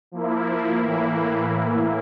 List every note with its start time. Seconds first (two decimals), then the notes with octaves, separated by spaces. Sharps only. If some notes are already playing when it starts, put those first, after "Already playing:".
0.12 F3 A#3 E4
0.80 A2 E3 A#3 E4